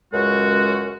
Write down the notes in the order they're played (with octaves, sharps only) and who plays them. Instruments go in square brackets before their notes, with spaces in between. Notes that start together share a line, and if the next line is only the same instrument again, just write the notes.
[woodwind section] C#2 F#2 G#3 F#4